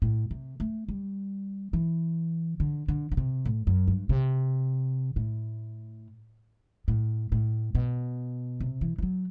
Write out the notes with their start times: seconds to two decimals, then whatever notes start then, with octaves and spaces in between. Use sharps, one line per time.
0.02 A2
0.31 C3
0.60 A3
0.89 G3
1.73 E3
2.60 D3
2.88 D3
3.12 D3
3.17 C3
3.45 A2
3.67 F#2
3.88 G2
4.09 C3
5.16 A2
6.88 A2
7.32 A2
7.75 B2
8.60 C3
8.81 E3
8.98 E3
9.02 F#3